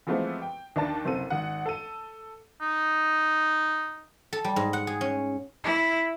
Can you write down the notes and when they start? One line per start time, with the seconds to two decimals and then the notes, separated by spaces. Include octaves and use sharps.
0.07 E3 F3 G#3 A3 B3 C4
0.42 G5
0.76 D#2 D4 A5 A6
1.05 F#1 C3 C4 A4 D#7
1.30 G#1 F#5
1.66 A4 D#7
2.61 D#4
4.33 A4
4.44 G3
4.56 G#2
4.73 F#5
4.87 G#4
5.01 C#4
5.64 E4